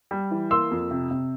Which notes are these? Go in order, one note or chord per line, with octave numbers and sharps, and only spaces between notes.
G3
E3
A#3 C6 E6
F2
C3
C3